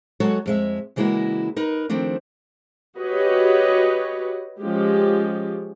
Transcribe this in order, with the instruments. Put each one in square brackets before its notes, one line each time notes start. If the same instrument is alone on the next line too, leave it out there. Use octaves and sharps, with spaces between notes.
[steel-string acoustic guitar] F#3 G#3 F#4 A4 C#5
F2 G#3 E5
C#3 E3 G#3 A#3 E4 F#4
D#4 A#4 B4
D#3 F3 A3 C4 D4
[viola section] F#4 G4 B4 C#5 D#5
F3 G#3 C#4 G4